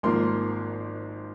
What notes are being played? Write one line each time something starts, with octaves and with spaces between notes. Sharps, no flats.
G#1 G#2 F3 A#3 C6